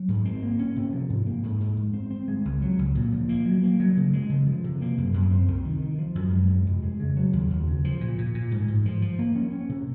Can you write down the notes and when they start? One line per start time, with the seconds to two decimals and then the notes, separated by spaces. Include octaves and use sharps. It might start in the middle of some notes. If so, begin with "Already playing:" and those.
Already playing: F#3
0.08 G#2
0.25 C4
0.43 A#3
0.59 C#4
0.76 C3
0.93 F3
1.10 G#2
1.26 A#3
1.43 G#2
1.61 G#2
1.77 G#2
1.93 C4
2.11 C4
2.28 G#3
2.45 C#2
2.62 F#3
2.79 C#2
2.95 A#2
3.13 F3
3.29 A#3
3.46 F#3
3.63 A#3
3.80 F#3
3.97 C#3
4.13 G#3
4.30 C#3
4.47 F3
4.64 C3
4.81 A#3
4.98 F#2
5.14 F#2
5.31 C4
5.48 C2
5.65 D#3
5.82 D#3
5.99 F3
6.15 F#2
6.32 G#3
6.49 C3
6.66 F2
6.83 G#3
7.00 C#3
7.17 F#3
7.33 D#2
7.50 D#2
7.67 C#3
7.85 F3
8.01 A#2
8.18 A#2
8.34 A#2
8.52 G#2
8.68 G#2
8.86 F3
9.02 F3
9.19 A#3
9.35 C#4
9.52 C#4
9.69 C3